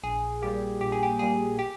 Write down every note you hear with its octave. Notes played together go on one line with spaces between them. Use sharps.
A#1 G#4
A#2 G3 A#3 G4
A#1 G4
G#4
G4
A#2 G3 A#3 G#4
G4